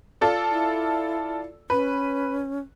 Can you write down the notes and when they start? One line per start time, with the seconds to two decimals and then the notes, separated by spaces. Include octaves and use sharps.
0.21 F4 A4 D5
0.51 E4
1.70 C#4 B4